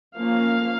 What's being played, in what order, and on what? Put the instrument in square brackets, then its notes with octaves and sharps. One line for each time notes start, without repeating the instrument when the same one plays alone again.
[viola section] F3 A#3 C#4 F5